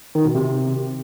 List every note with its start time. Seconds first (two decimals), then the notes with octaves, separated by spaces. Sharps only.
0.15 D#3
0.25 B2
0.35 C3